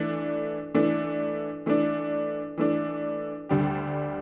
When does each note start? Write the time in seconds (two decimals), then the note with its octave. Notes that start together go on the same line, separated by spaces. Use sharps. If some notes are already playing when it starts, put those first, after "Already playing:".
Already playing: E3 A3 D4
0.74 E3 A3 D4
1.66 E3 A3 D4
2.58 E3 A3 D4
3.49 D2 D3 G3 D4 G4